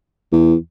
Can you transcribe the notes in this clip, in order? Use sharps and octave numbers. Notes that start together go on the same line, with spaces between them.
E2